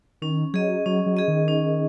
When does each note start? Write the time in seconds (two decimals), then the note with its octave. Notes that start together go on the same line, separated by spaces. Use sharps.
0.22 D#3 C#4
0.54 F#3 G#4 D#5
0.86 F#3 C#4
1.06 F#3
1.17 G#4 D#5
1.28 D#3
1.48 C#4